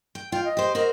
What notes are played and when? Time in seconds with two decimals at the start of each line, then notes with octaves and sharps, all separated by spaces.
0.15 G5
0.32 F4 G5
0.45 D#5
0.57 G4 C5
0.75 F#4 A#4 C5